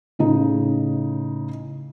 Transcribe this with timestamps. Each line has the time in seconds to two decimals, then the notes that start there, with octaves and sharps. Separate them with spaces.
0.19 A2 C#3 D#4